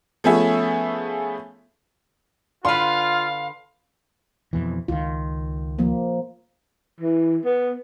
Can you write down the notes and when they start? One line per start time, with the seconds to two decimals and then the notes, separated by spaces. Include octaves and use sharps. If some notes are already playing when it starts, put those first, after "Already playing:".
0.24 F3 A3 B3 C#4 G#4 E5
2.65 D3 F4 B4 F5 C6
4.53 F2 B2 E3
4.88 C#2 D#3 F4
5.79 F3 A#3
7.00 E3
7.45 B3